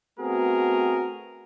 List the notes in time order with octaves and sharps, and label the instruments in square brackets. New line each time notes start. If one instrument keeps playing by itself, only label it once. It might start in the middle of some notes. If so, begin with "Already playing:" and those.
[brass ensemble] A3 B3 C4 F#4 G#4 A#4